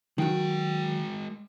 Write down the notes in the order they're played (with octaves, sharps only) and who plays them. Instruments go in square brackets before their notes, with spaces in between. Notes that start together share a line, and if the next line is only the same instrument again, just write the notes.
[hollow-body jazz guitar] D#3 F#3 [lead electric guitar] G#3 G5